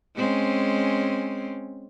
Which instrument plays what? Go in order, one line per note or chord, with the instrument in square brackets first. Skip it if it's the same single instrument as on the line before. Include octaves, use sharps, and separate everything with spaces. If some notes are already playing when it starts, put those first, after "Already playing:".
[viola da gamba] G#3 C4 C#4